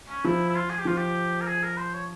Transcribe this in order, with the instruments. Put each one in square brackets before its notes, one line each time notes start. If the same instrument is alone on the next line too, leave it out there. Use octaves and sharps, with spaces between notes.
[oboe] C#4
[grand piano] F3 [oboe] E4
[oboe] E4
F4
G#4
G4
[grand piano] F3 [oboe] F4
[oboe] G4
A#4
G#4
A#4
C5
C#5